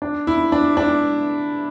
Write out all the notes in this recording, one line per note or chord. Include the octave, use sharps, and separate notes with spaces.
D4
E4
D4
D4